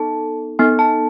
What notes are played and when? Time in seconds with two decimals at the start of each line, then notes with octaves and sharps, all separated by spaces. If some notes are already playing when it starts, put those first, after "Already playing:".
Already playing: B3 D#4 A4 A5
0.59 B3 D#4 A4 G#5
0.79 A5